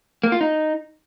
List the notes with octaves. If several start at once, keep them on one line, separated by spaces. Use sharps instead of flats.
A#3
F4
D#4